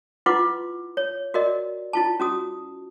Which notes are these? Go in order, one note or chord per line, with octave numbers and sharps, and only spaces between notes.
E4 F4 B4 F#5 C6 D6
C#5
F#4 A#4 D5 D#5
E4 F4 A5
C#4 F#4 D#6